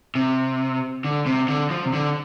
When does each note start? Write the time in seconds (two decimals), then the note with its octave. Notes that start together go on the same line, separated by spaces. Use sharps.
0.15 C3
1.05 D3
1.26 C3
1.48 D3
1.70 F3
1.85 C3
1.93 D3